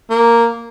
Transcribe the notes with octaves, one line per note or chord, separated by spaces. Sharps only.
A#3